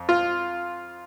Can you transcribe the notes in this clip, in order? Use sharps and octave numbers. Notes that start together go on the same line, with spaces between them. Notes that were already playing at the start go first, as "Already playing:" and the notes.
Already playing: F2
F4